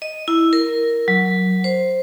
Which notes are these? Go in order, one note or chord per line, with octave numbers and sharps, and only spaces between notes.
D#5
E4
A#4
F#3
C5